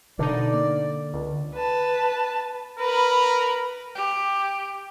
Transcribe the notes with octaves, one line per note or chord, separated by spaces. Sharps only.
B2 D3 D4 D#4 D5
A#3
C#2
B4 A5
A#4 B4 B5
G4